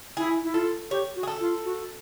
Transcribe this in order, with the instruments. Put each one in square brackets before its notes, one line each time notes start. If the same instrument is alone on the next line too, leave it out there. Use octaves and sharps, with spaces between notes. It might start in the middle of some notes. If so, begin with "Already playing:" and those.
[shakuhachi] E4 [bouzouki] G#4
[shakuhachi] E4
[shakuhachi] F4 [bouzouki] A4
[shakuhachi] G4 [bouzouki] C#5
[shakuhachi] F#4
[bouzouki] G#4
A4
[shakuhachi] F4
F#4